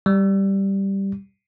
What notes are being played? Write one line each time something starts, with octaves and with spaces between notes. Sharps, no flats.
G3